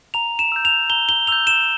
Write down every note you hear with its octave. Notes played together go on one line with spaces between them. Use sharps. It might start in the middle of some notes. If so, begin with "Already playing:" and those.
A#5 F7
E7
E6 G6
F7
A#5 G7
G7
E6 G6 F7
E7